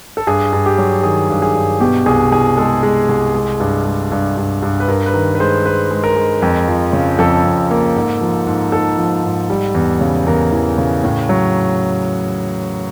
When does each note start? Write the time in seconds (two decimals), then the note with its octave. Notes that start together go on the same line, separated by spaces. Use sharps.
0.17 A4
0.27 G2 G#4
0.53 G2
0.66 G4
0.78 F#3
1.03 D#3 G#4
1.30 G2
1.42 G#4
1.55 G2
1.80 B2 G4
2.06 C2 G#4
2.32 C2 G#4
2.57 G#3 A4
2.83 G#3
3.09 C2
3.35 G#3
3.60 G2
3.86 G#3
4.12 G2
4.37 G2
4.63 G2
4.80 B4
4.88 G2 A#4
5.06 B4
5.13 D#3 A#4
5.35 B4
5.40 G#3 C5
5.65 G#3 B4
5.91 G#3
6.04 A#4
6.16 G#3
6.42 F2
6.68 F3
6.93 C#3
7.19 F2 A4
7.45 F2
7.71 A#3
7.96 G#2
8.21 F3
8.47 G#2
8.72 G#2 A4
8.98 F3
9.24 G#2
9.50 G3
9.75 E2
10.01 C#3
10.27 E2 A#4
10.52 E3
10.78 C#3
11.04 A2
11.29 F#3